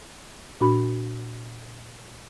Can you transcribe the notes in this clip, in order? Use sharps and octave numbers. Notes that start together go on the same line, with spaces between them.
A#2 D4 F#4 B5